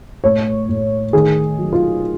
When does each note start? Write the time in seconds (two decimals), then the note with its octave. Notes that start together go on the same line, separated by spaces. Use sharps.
0.24 A2 C#5
0.69 A2
1.13 D#3 G#4
1.59 F#3
1.73 F4